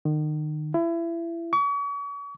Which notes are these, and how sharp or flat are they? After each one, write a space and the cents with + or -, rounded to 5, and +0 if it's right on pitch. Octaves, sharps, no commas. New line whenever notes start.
D#3 -35
E4 +30
C#6 +40